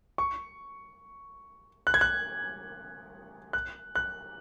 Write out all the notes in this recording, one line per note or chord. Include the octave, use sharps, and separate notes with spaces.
C#6
F#6
G#6
F#6
F#6
F#6